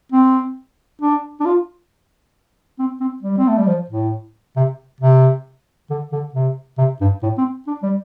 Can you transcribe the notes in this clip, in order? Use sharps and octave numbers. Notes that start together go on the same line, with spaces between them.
C4
D4
D4
F4
C4
C4
G3
C4
A3
G3
F3
A2
C3
C3
D3
D3
C3
C3
G2
A2
C4
D4
G3